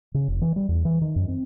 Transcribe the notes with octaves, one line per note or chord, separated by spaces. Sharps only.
C#3
F1
E3
G3
E2
E3
D#3
F#2
C4